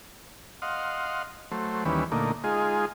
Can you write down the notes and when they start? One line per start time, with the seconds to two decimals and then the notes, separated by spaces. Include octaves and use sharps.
0.62 D#5 F5 F#5 C6
1.52 F#3 A3 C5
1.85 D#2 E3 G3 C#4 B4
2.12 A#2 D3 A3 A#3 D#4
2.44 G#3 D#4 F4 G#4